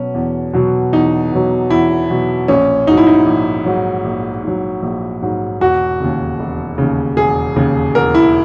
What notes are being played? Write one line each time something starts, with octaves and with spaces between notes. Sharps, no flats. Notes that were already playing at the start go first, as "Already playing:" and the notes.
Already playing: B2 F#3 C#4
E2
B2 F#3
E2 D#4
B2 F#3
E2 E4
B2 F#3
A#1 C#4
G#2 F#3 D#4
E4
D#4
A#1
G#2 F#3
A#1
G#2 F#3
A#1
G#2 F#3
E1 F#4
D#2 C#3
E1
D#2 C#3
E1 G#4
D#2 C#3
E1 A#4
E4